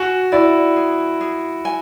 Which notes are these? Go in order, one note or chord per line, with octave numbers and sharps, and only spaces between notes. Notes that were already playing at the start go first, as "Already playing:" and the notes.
Already playing: F#4 G#5
E4 D5
G#4
G#4
G#5